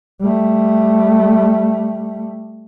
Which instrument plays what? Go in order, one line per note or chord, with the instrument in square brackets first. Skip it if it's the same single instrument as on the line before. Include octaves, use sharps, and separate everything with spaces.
[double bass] G3 A3